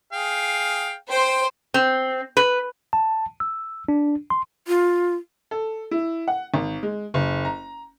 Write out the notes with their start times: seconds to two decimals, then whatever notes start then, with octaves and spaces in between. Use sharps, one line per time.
0.13 G#4 F5 G5
1.10 C5 G5
1.74 C4
2.37 B4
2.93 A5
3.40 E6
3.88 D4
4.30 C6
4.68 F4
5.51 A4
5.91 E4
6.28 F#5
6.54 G#1
6.83 G#3
7.14 F#1
7.45 A#5